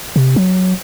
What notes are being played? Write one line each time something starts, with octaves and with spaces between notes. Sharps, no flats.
C3
F#3